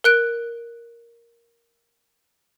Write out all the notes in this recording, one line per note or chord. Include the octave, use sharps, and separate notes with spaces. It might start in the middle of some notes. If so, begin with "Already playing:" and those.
A#4 F#6 D7